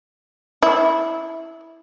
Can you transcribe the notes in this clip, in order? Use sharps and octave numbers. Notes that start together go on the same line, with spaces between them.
E4